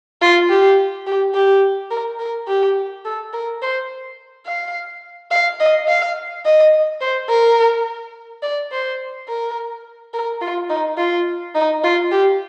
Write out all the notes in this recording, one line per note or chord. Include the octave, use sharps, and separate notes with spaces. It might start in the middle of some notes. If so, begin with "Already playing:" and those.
F4
G4
G4
G4
A#4
A#4
G4
A4
A#4
C5
F5
F5
D#5
F5
D#5
C5
A#4
D5
C5
A#4
A#4
F4
D#4
F4
D#4
F4
G4